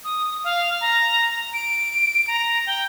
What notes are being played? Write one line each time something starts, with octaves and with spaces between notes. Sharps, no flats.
D#6
F5
A#5
D7
A#5
G5